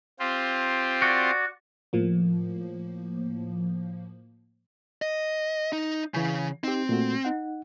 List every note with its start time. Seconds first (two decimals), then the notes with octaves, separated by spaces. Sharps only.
0.19 C4 F4 G4
1.02 F#4 D5
1.93 A2 F3 A#3
5.02 D#5
5.73 D#4
6.14 C#3 E3 G#5
6.64 C4 D#4 G4
6.89 A#2 A3 F#4
7.25 D#4 F#5